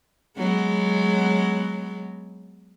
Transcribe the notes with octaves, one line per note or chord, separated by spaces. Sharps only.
F#3 G#3 B3